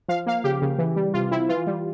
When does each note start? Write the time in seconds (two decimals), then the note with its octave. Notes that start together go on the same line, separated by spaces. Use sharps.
0.08 F3 F5
0.26 A#3 F5
0.44 C#3 G4
0.62 C#3
0.78 E3
0.96 G3
1.14 C3 F4
1.31 C4 E4
1.49 E3 F4
1.67 G3